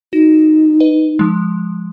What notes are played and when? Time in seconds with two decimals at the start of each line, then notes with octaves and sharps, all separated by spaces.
0.13 D#4 F#4
0.80 B4 D#5
1.19 F3 G#3